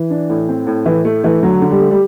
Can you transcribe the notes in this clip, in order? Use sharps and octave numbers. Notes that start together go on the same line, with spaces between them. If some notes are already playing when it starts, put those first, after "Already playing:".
Already playing: E3
D4
A2
C4
A2
A2 E3
A3
E3 A3
D3 F#3
D3
G3
A3
G3